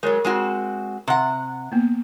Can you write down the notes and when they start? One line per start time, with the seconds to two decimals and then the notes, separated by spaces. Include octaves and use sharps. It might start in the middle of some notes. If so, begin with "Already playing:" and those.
0.03 F#3 G#3 A#4 C#5
0.25 G#3 C4 F#4
1.08 C3 F#5
1.72 A#3 B3